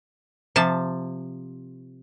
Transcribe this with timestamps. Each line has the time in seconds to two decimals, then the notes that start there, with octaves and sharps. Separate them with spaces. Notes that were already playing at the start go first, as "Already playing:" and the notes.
0.56 C3 F3 A5